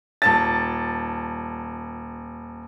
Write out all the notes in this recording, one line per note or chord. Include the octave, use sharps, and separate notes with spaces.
D#1 A5 A6